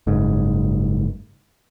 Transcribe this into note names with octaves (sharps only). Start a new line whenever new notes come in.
F#1 G#2